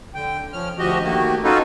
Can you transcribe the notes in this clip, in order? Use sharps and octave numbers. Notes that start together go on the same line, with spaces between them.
D3 G5
F3 C#4 F6
D2 F3 F#4 G4 D#5
D#3 A3 A#3 F#4 G4
C#4 D#4 F4 F#4 A4 B4